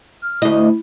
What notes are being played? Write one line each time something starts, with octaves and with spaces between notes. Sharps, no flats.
F6
D2 E4 D#5